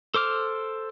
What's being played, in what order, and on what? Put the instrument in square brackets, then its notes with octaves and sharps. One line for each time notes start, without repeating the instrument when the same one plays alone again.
[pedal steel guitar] A4 C5 D6 F6